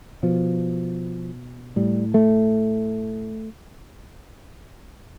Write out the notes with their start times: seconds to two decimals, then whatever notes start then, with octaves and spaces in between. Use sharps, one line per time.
0.23 B2 F3
1.76 A2 G3
2.14 A3